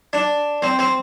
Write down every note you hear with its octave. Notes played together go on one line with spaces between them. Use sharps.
D4
C4
C4